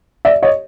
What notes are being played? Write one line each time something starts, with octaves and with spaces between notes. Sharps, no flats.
D5 E5
C#5 D#5